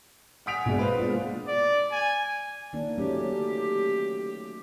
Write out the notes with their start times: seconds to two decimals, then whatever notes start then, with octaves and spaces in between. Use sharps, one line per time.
0.46 F#5 G#5 D#6 B6 D7 F7
0.65 A#1 B2 G#3 D4
0.79 B4 C5 F5
0.99 G#3 A#3 B3 D4 F4
1.48 D5
1.92 G#5
2.73 D#3 A#3 D4
2.98 F#3 A3 C#4 G4